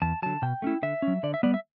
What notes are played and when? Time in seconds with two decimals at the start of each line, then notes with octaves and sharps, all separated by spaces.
0.02 E2 A5
0.22 D3 F#3 A5
0.42 B2 G5
0.62 A3 C#4 E4
0.83 D3 E5
1.02 C#4
1.08 F#3
1.23 D3 D5
1.34 E5
1.43 G3 B3 D5
1.54 E5